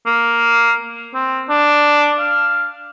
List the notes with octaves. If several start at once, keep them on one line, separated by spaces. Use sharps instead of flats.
A#3
C4
D4
F5